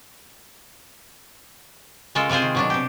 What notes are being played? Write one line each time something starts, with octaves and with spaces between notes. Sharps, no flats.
C#3 G#3 F4 A4 A#4
C3 G#3 F4 G#4 C5
D#3
B2 F#3 D4
C3 G4